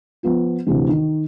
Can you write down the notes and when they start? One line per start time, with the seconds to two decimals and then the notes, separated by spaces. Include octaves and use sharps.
0.23 F3 B3 F4
0.67 D2 C3 E3
0.89 D#3